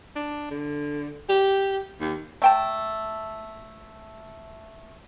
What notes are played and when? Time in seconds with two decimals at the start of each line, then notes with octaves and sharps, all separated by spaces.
0.16 D4
0.51 D3
1.29 G4
2.00 D#2
2.42 A3 G5 A5